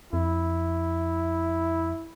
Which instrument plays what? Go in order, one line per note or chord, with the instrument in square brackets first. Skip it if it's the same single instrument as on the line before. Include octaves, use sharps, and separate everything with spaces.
[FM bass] F2 [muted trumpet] E4